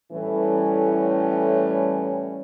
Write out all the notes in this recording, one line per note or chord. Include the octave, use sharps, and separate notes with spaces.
A2 E3 G3 A3 C#4